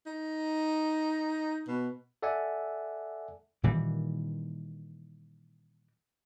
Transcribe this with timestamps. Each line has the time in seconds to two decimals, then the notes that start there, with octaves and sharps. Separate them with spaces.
0.06 D#4
1.68 B2
2.22 A4 D5 E5 F#5 G#5
3.63 A#2 D#3 E3 G3